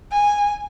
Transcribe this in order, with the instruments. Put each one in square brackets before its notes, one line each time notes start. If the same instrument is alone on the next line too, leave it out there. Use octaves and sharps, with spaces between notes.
[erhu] G#5